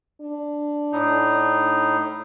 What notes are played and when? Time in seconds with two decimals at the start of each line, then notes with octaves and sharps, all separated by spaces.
0.21 D4
0.93 A2 D#4